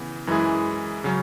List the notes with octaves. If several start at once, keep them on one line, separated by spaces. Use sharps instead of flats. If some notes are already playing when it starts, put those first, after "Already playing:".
Already playing: C#3 E3 B3
F#2 E3 G#3 E4 G#4
C#3 F#3 C#4